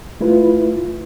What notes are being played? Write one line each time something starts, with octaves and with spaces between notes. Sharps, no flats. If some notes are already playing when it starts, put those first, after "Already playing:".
A3 E4 F4 B4